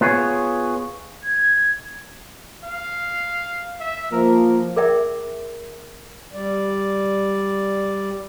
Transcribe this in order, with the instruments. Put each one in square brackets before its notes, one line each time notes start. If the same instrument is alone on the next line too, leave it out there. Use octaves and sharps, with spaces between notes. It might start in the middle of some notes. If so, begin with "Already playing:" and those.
[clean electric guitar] B3 F4 G#4 C#5
[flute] G#6
[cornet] F5
E5
[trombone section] F3 A#3 [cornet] A#4
[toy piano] G#4 A#4 D5 E5 G5
[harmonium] G3 D5